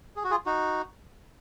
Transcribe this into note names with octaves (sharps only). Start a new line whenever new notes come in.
G#4
F#4
F4 G#4
D#4 F#4